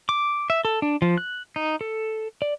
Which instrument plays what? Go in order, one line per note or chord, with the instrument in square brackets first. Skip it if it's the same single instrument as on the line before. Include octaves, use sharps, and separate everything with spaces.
[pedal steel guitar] D6
E5
A4
D4
F3
F#6
D#4
A4
D5